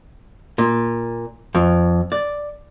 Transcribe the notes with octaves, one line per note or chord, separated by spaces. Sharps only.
A#2
F2
D5